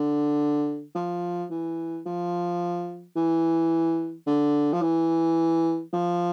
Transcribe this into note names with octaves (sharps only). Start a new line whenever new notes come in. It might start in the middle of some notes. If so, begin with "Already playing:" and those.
Already playing: D3
F3
E3
F3
E3
D3
F3
E3
F3